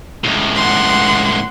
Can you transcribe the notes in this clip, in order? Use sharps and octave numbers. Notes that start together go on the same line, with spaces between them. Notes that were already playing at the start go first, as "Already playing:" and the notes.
C#2 A2
F#5 C6